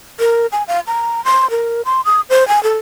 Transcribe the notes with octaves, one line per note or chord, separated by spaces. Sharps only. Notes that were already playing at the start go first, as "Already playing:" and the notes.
A#4
G#5
F5
A#5
C6
A#4
C6
D#6
C5
G#5
A4